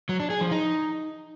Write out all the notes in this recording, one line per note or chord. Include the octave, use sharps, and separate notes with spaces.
F#3
D4
G#4
F3
D#4